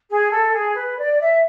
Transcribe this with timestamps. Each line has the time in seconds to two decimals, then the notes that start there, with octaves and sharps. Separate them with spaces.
0.10 G#4
0.32 A4
0.54 G#4
0.76 B4
0.98 D5
1.21 E5